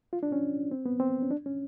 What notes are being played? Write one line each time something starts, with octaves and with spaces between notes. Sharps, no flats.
F4
D4
C#4
C4
B3
C4
C#4
D4
C#4